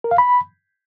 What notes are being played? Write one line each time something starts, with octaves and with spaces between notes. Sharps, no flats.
A#4
F5
B5